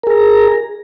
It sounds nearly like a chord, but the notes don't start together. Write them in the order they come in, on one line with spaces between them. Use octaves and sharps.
A#4 G#4 A#5